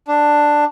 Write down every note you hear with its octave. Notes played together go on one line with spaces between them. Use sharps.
D4